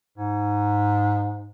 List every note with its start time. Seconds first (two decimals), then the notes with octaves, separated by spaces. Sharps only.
0.18 G#2